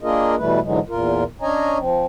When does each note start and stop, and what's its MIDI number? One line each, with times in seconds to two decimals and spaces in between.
0.01 0.35 58
0.01 0.35 62
0.01 0.35 65
0.01 0.35 68
0.01 0.35 70
0.01 0.35 75
0.38 0.60 47
0.38 0.60 52
0.38 0.60 55
0.38 0.60 57
0.38 0.60 71
0.62 0.79 44
0.62 0.79 50
0.62 0.79 52
0.62 0.79 54
0.62 0.79 56
0.89 1.24 40
0.89 1.24 46
0.89 1.24 65
0.89 1.24 70
1.42 1.78 61
1.42 1.78 62
1.42 1.78 73
1.42 1.78 75
1.42 1.78 80
1.42 1.78 82
1.78 2.06 53
1.78 2.06 60